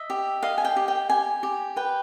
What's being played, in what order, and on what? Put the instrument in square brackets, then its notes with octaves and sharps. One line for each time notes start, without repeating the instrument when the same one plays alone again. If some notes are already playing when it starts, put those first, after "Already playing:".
Already playing: [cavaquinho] D#5 E5
G4
D#5 F5
G#5
G5
G4
G5
G4 G#5
G4
B4 G5